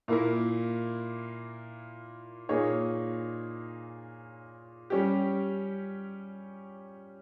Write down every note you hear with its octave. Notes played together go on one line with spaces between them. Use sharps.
A#2 A#3 E4 A#4
A#2 A#3 D#4 G#4 C#5
G3 C#4 G4